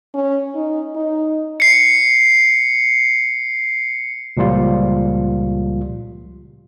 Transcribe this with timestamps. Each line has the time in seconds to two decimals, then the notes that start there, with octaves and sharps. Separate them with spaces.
0.14 C#4
0.55 D#4
0.96 D#4
1.60 C7 C#7
4.37 C#2 A#2 F3 G3 F4